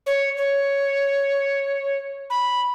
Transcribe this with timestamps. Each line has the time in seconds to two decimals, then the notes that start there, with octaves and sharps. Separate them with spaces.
0.06 C#5
0.37 C#5
2.30 B5